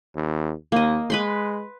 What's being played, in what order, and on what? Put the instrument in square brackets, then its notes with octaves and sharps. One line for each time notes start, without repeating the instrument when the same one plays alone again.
[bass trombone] D#2
[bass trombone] D#2 [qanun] A#3 D#5
[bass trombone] G#3 [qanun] B4 B5 C6